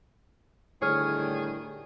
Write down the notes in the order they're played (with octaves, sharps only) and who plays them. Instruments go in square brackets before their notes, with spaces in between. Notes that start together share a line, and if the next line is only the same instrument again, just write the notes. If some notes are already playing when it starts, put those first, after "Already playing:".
[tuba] A2 [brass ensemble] D3 D#3 G3 [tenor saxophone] G#4 [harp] C#5 F6